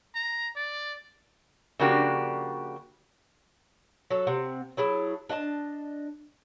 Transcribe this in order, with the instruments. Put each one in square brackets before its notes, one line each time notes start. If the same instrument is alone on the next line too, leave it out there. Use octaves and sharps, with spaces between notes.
[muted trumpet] A#5
D5
[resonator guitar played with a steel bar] C#3 F3 A#3 D4 F#4 G4
[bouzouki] F#3 A4
C3 C4 F#5
F#3 E4 G#4 A5
D4 D#5 G#5 A5